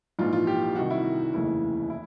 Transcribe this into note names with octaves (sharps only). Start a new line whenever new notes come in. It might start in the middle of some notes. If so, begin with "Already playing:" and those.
A#1 G#2 E3 F4
F4
G4
C2 C3 D#3 F#4
E4
F1 D#2 C#3 E3 E4
E4